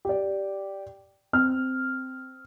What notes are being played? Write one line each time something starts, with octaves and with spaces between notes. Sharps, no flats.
G4 D5
C4 F6